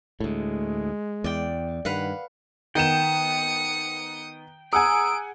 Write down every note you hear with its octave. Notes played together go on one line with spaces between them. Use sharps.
D2 A2 G#3
E2 D5 G5
G2 D#3 B4 F5 F#5
D#3 B3 G5 D#6 C#7 E7
G#4 F#5 G#5 A#5 D#6 E6 D7